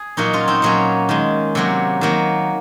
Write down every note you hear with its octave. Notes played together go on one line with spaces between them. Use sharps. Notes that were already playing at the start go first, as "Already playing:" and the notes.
Already playing: G#4
A#2 F#3 A#3 D#4 F#4
C#4 F4
C4 D#4
A#2 F#3 A#3 C#4
D#3 G#3
C3 F#3 A#3
D#3 F#3 A#3